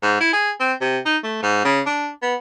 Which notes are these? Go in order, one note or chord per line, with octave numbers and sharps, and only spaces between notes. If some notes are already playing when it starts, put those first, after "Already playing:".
G#2
E4
G#4
C4
C3
D#4
A3
G#2
C#3
D4
B3